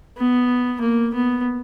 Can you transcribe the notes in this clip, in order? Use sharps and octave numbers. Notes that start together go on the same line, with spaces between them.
B3
A#3
B3